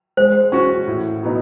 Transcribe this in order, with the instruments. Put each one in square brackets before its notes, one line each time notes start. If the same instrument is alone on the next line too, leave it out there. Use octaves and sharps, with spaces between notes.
[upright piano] G#3 [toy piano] C5
[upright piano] C#4 F#4
A2
F#3 B3 D#4